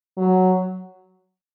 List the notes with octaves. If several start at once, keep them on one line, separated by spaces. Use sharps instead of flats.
F#3